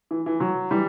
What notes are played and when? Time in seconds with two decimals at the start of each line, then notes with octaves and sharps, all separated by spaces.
0.11 E3
0.26 E3
0.40 F#3
0.71 E3 G3